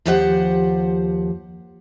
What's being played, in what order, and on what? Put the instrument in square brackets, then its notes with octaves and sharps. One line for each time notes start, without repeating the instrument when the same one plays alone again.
[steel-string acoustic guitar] D#2 F3 G4 C5 D5 F#5